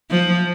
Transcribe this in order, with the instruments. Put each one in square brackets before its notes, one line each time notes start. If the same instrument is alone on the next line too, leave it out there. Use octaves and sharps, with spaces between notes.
[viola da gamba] F3